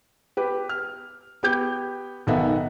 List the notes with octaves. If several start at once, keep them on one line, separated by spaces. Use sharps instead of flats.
G4 B4
F6
B3 G4 G6
B1 D#3 B3 A4 E5 F#5